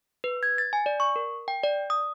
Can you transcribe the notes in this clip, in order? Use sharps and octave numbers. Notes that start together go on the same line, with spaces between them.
B4
G#6
A6
G#5
D5
C#6
A#4
G5
D5
D#6